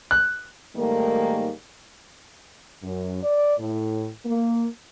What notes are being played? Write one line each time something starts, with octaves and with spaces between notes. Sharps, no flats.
F#6
G#2 D#3 G3 A3 A#3
F#2
D5
A2
A#3